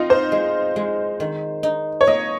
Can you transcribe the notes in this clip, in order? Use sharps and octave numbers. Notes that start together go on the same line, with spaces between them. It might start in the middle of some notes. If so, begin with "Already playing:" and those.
Already playing: C4 D#4 F4 F#4
C5
G#3
G#3
D#3
D#4
C#5
A#3 D#5